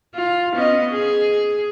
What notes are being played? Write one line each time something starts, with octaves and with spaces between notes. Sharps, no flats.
F4
B3 C#4 D#5
G#4